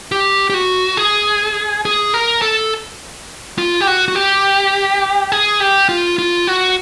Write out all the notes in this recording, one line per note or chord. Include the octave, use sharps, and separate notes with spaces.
G4
G4
F#4
G#4
G#4
A#4
A4
F4
G4
F#4
F#4
G4
G#4
G4
F4
F4
F#4